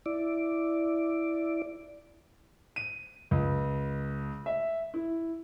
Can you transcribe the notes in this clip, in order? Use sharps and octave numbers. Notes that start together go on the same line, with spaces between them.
E4 D5
D#7
C#2
E5
E4